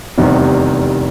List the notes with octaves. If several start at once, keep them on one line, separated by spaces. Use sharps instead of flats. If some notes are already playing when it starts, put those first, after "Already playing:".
F1 E2 C3 D#3 G3